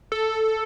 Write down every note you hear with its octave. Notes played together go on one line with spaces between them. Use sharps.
A4